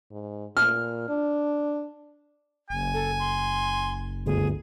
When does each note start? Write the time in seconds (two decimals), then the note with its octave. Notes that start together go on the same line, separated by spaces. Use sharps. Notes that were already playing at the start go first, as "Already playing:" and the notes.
0.11 G#2
0.57 A#2 F6
1.09 D4
2.70 F#1 G#5
2.94 A4
3.19 C6
4.26 G1 D2 G#4